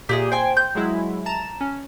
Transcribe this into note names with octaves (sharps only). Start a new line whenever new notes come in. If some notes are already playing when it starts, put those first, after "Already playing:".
A#2 G4 G#4 D#5
C5 G5 G#5
G6
F#3 G#3 E4
A5 A#5 E7
C#4